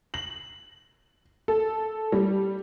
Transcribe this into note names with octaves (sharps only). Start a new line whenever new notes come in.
F#7
A4
G3